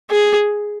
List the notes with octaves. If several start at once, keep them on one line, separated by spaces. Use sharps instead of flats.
G#4